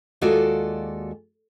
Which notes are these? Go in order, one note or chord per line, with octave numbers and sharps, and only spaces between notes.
D#2 G#3 F4 F#4 A4 D5